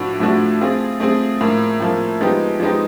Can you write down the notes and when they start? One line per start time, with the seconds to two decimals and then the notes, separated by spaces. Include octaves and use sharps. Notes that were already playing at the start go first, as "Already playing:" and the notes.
Already playing: A2 F3 A3 D4 F#4
0.20 A2 F3 A3 D4 F#4
0.61 A3 C4 F4 G#4
1.00 A3 C4 F4 G#4
1.41 A2 F3 A#3
1.80 A2 F3 A#3
2.21 F3 G#3 B3 D#4 G4
2.60 F3 G#3 B3 D#4 G4